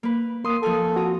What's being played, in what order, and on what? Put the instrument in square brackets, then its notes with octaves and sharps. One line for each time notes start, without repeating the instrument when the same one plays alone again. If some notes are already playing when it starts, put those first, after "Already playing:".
[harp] A#3 B4
[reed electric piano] A#3 D#6 [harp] C6
[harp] F3 F5 G#5 [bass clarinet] A4
[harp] C4 A#5 D#6 [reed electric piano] F#4